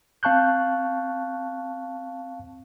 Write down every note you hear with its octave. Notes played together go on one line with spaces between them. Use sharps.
C4 F5 A5 C#6 F#6 G6